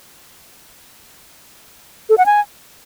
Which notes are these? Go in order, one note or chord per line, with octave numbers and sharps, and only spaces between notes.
A4
F#5
G#5